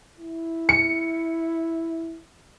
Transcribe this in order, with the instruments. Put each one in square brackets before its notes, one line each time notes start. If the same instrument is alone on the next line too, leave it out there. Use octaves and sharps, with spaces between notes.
[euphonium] E4
[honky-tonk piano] C#7